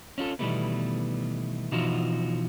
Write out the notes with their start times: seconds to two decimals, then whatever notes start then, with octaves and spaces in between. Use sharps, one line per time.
0.18 C#4 D4 F4 A4
0.39 B2 D#3 E3 G3 A3 B3
1.72 B2 E3 F3 D#4 F4 F#4